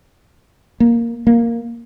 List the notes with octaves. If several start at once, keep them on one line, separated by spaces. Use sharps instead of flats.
A#3
A#3